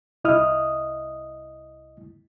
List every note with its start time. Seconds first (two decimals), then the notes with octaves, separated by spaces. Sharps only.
0.24 C2 E4 D#5 D#6 F6